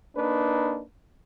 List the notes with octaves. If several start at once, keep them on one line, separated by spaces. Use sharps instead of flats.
A#3 D4 D#4 B4